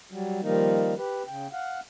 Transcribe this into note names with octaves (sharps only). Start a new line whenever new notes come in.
F#3 G3
D#3 F3 G3 A#3 D#4
G4 B4
C#3 G5
F5 F#5